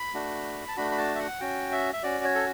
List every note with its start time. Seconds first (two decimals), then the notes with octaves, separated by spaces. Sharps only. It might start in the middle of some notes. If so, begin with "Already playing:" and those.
Already playing: B5
0.14 A3 D4 F#4
0.68 A5
0.77 A3 D4 F#4 B5
0.91 B5
0.98 A5
1.15 E5
1.19 F#5
1.40 C#4 F#4 G5
1.72 E5
1.93 E5
2.03 C#4 F#4 D5
2.24 C#5
2.35 A4